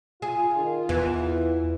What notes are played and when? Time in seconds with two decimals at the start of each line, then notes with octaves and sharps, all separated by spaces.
0.22 F4 G#4
0.56 D#3
0.89 E2 E3 B3